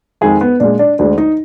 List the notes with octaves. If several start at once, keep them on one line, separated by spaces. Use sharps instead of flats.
F2 D#3 G#3 G#4
B3
A#2 G#3 D4
D4
D2 D3 G#3 D4
D#4